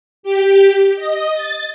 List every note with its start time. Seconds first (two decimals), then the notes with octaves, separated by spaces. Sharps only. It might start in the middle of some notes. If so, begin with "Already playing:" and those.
0.23 G4
0.96 D#5
1.34 A6